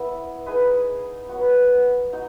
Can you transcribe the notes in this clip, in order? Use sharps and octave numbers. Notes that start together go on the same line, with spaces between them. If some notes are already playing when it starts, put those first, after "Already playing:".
Already playing: B3 E4 B4
D#4 G#4 B4 D#5
F#3 B3 F#4
D#4 F#4